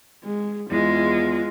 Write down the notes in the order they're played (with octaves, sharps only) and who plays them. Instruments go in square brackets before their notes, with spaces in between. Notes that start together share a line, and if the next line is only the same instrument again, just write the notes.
[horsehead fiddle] G#3
[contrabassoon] E2 [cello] G#3 [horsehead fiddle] F4